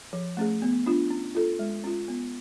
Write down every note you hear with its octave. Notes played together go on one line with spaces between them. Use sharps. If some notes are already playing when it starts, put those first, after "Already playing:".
F3
A3 C#4 G#4
B3
D4 F4
C#4
F4 A4
G#3
C#4 F4
B3